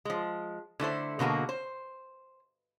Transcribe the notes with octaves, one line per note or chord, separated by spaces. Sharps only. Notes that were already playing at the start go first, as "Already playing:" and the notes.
F3 G#3
D3 A3 E4 C5
B2 D3 A#3 F#4 G#4
C5